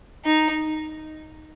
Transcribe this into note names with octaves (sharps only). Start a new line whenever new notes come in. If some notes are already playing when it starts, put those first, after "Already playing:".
D#4